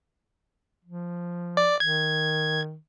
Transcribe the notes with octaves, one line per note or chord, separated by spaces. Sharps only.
F3
D5
D#3 G#6